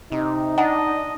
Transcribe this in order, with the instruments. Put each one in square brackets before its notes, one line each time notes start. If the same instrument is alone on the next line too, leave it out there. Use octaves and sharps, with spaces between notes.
[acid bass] C3 [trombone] D#4
[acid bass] D4 [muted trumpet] D#5 [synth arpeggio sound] F#5 G#5 A#5